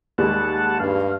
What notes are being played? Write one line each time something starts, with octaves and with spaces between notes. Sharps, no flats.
D#2 G3 G#3 F#5 A5
G2 F5